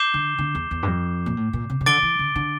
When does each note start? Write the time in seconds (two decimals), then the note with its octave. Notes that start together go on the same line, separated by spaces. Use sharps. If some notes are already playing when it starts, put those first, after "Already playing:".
Already playing: D6 G6 C7 E7 G7
0.14 D3
0.38 D3
0.55 E2
0.71 E2
0.83 G2
0.87 F2
1.26 A#2
1.37 A2
1.53 A#2
1.70 C3
1.81 C3
1.86 D3 D6 A6 D7 G7
2.03 E3
2.19 D3
2.35 D3